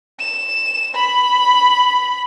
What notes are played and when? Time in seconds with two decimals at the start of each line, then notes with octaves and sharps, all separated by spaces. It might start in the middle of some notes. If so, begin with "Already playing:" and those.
0.19 E7
0.94 B5